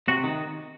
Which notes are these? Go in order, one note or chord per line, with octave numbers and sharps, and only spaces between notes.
C3 F#4
D#3